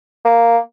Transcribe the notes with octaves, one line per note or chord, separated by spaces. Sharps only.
A#3